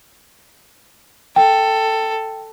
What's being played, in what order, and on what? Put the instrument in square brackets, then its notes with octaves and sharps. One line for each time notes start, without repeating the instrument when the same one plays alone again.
[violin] A4 [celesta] G5